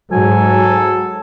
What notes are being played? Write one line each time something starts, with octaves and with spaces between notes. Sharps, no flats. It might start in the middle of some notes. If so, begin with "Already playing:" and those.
G#2 F#3 A4 G#5